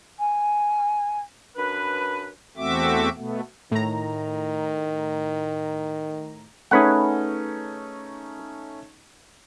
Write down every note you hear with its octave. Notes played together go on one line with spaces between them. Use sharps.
G#5
F#2 D4 B4
E2 A3 C4 F#4 E5 D6
B2 A3 B3
A2 D#3 A#5
A3 C#4 D#4 G#4 B4 F#5